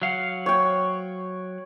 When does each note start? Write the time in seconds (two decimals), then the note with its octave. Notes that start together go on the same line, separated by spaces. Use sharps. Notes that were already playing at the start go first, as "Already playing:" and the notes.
0.02 F#3 F5 F#5
0.46 C#5 G5